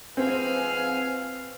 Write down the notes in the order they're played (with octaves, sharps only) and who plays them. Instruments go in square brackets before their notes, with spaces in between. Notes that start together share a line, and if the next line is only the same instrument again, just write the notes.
[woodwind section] G#2 F3 G#5 [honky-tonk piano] C4 [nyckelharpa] B4 F5